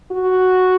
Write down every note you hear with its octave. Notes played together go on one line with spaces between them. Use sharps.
F#4